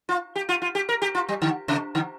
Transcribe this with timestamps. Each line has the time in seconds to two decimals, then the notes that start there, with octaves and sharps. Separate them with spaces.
0.09 F4
0.36 G4
0.49 F4
0.62 F4
0.75 G4
0.89 A#4
1.02 G4
1.15 F4
1.29 G3
1.42 D3
1.68 C3
1.95 D3